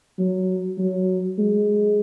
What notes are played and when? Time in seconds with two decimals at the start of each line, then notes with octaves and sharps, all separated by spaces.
0.19 F#3
0.78 F#3
1.39 G#3